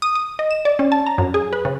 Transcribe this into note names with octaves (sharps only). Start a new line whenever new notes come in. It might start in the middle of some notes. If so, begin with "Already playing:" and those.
D#6
D#6
D#5
E7
D5
C#4
A5
A#5
F#2
G#4
B4
C#3